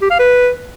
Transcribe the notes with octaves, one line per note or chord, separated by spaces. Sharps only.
G4
F5
B4